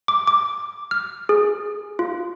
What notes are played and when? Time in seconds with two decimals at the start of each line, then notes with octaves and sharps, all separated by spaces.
0.08 D6
0.27 D6
0.91 F6
1.29 G#4
1.99 F4